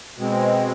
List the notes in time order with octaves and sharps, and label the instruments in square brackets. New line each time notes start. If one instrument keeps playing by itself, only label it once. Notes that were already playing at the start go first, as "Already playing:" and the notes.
[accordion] B2 G#3 C4